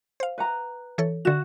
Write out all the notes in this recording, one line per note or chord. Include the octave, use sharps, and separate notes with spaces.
C5 F5
B4 F#5 A#5
E3 A4 C#5
D3 F#4 F#5 E7